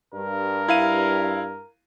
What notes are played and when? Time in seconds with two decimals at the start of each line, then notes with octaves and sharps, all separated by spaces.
0.14 G2 A#4
0.68 E4 F5 D#7